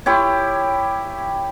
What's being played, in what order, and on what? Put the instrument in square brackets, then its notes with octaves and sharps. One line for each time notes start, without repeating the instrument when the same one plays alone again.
[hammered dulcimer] E4 G4 C#5